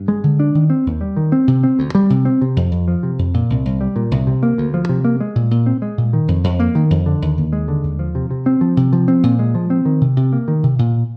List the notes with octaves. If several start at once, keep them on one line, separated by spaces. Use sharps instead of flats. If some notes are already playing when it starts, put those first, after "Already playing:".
Already playing: G2
G#3
D3
D4
D#3
C4
D#2
G3
D#3
C4
C3
C4
D2
G3
C3
C4
C3
F2
F2
F3
C3
F2
A#2
C2
C2
G3
A#2
C2
C3
A#3
D2
F3
C3
A#3
G#3
A#2
A#2
C4
G#3
A#2
D#3
F2
F2
A#3
D#3
F2
D3
D#2
D#2
G#3
D3
D#2
F3
C3
C3
C4
F3
C3
F3
C4
A#2
G#3
F3
C4
D#3
C3
C3
A#3
D#3
C3
A#2